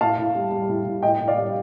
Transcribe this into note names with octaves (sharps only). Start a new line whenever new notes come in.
A2 F5 A5
A2
G3
G3
A2
A2
A2 D#5 G5
A2
D5 F5
G3